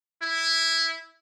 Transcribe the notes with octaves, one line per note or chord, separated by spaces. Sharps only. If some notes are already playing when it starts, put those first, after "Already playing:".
E4